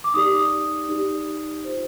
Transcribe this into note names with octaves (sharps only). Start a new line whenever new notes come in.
D6
D#4 G4 D5 D#6
D#4 G4 D5
F4 C5